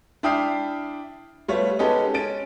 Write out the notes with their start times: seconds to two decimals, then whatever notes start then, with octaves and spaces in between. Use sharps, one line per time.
0.23 D4 E4 G5 D#6 F6 C7
1.48 G3 A3 B3 F4 C#5
1.79 G#3 B3 C#4 D#4 G4 A4
2.14 C#4 A6 D7